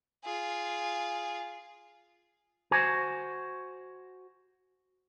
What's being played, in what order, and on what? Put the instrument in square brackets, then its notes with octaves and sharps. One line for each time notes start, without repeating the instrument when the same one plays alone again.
[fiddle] F4 G#4
[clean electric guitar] F#4 C5 G#5